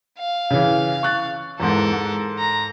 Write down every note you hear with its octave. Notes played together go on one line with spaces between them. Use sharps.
F5
C#3 E3
C#6 F#6 A6
E2 G#2 A4 A#4
G#2
A#5